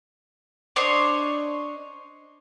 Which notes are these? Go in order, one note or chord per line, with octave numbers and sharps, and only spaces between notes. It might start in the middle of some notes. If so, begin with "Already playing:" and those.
D4 C5 C#5 D#5